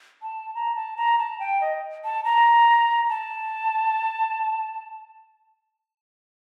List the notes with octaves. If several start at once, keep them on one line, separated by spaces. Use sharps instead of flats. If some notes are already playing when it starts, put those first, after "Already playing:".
A5
A#5
A5
A#5
A5
G5
D#5
A5
A#5
A5